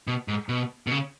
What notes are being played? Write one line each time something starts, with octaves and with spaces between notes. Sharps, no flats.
B2
G#2
B2
B2
C#3